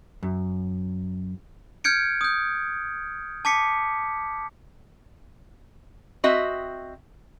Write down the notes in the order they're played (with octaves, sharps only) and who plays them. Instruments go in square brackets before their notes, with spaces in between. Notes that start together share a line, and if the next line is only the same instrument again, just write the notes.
[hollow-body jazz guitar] F#2
[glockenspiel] F6 G6 G#6 C#7 D7
D#6 G6
A5 D6 B6 C#7
[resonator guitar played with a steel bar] C4 F#4 D#5 E5